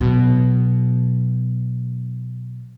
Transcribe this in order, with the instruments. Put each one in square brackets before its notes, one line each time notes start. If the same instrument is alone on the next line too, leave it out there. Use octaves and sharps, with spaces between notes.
[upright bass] B2 F#3